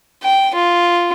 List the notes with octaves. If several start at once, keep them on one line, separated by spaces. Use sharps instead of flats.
G5
F4